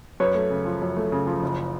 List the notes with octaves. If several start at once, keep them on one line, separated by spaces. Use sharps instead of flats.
F#2 B4 C#5
A3
C#3
F3
F#2
A3
C#3
F3
F#1